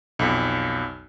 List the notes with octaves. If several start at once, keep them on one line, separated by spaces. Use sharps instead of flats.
B1 F2